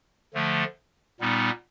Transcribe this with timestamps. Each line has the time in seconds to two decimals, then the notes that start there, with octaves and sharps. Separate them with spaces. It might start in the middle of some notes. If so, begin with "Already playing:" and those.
0.34 D3 F3 A3
1.20 A#2 G3 B3 D#4